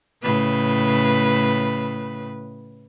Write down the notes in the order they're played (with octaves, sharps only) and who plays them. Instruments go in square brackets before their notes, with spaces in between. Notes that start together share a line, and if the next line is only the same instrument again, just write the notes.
[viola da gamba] A2 C#3 B4